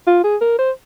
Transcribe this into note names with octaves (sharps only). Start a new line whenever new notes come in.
F4
G#4
A#4
C5